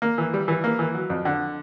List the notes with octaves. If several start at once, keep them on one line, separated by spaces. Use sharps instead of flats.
A#3
E3
G3
E3
A#3
E3
F#3
F2
D3